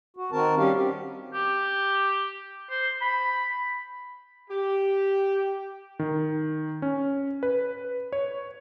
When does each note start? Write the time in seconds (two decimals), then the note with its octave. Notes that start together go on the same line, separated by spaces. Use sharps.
0.17 F#4
0.32 D#3 C4 F#4 A#4 A5
0.58 G3 C#4 G4 F5
0.75 C4 G4
1.34 G4
2.70 C5
3.01 B5
4.50 G4
5.99 D#3
6.82 C#4
7.43 B4
8.12 C#5